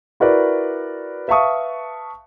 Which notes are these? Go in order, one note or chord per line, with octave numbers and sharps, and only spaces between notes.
E4 F#4 A#4 B4 D5
B4 E5 F5 A5 C#6 D#6